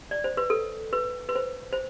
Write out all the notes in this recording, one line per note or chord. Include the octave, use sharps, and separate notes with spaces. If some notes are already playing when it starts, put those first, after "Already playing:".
D5
C5
B4
A4
B4
B4
C5
C5